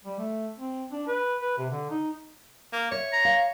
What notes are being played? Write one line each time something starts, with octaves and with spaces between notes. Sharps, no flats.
G3
A3
C4
D4
B4
B4
C3
D3
D#4
A#3
C#5 E5
A#5
F5